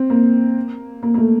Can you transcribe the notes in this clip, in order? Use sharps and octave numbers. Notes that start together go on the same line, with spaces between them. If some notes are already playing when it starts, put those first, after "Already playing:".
Already playing: C4
A#3
A#3
A#3
A3